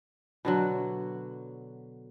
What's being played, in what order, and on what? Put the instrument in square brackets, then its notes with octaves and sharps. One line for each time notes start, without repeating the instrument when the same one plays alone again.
[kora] B2 D3 F#3